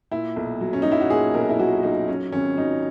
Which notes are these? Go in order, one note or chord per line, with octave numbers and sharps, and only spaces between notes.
A#2 E4
B1
F#3
C#4
F#3 D#4
E4
F#4
A#2 G#4
B1 A#4
E4
F#3 F#4
B1 D#4
F#3 C#4
G#1 C#4
F#3 D#4